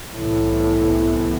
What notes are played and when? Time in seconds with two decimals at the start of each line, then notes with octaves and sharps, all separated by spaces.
0.16 C2 A2 C3 E3 B3